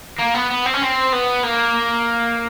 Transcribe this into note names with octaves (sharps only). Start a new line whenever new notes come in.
A#3
B3
B3
C4
C#4
C4
B3
A#3